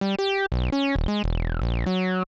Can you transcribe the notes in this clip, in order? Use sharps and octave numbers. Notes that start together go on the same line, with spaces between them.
G3
G4
B1
C#4
D#1
G#3
E1
A#1
F#3